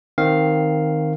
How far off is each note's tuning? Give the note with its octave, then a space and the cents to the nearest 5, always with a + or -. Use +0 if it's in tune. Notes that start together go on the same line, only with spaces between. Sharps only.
D#3 +0 C4 +0 F5 +0